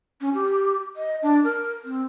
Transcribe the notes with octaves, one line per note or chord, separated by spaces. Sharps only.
C#4
G4
D#5
D4
A#4
C4